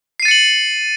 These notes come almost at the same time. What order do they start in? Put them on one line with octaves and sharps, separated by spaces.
C7 D#7 A6 C#7 F#7